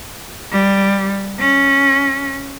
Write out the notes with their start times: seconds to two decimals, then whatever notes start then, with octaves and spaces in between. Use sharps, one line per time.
0.52 G3
1.40 C#4